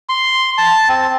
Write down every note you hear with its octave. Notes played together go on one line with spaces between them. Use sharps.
C6
A5
C4